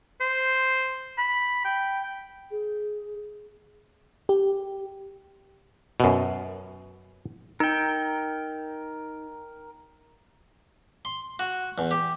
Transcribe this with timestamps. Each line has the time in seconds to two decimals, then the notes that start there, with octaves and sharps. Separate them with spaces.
0.21 C5
1.18 B5
1.65 G5
2.51 G#4
4.29 G4
6.00 F#2 B2
7.60 D#4 A#4 G5
11.05 C6
11.39 F#4
11.78 E2
11.91 G4